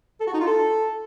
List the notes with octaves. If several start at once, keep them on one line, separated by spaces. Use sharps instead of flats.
A4
F#4
D#4
F4
A4